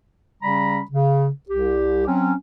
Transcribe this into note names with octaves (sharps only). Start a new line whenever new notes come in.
C#3 G3 C#4 A#5 B5
C#3
C2 G4
F#3 C4 C#4